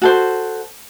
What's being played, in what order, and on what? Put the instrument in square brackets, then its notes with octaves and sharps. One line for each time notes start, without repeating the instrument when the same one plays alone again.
[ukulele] F#4 A4 C5